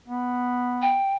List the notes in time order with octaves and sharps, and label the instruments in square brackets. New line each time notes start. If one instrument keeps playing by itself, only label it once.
[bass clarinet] B3
[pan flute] G5